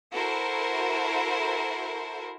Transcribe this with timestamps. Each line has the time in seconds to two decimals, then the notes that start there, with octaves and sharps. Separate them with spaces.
0.14 E4 F#4 A4 A#4 C5